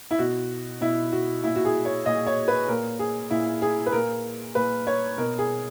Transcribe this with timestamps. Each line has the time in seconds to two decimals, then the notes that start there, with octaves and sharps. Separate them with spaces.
0.11 E4
0.19 B2 F#4
0.81 B2 E4
1.12 F#4
1.44 A#2 E4
1.56 F#4
1.65 G#4
1.85 C#5
2.06 A#2 D#5
2.27 C#5
2.48 B4
2.68 A#2 A#4
2.99 G#4
3.31 A#2 E4
3.62 G#4
3.86 B4
3.93 A#2 A#4
4.55 A#2 B4
4.87 C#5
5.18 B2 A#4
5.39 G#4